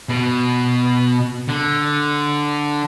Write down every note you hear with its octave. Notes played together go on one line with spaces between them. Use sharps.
B2
D3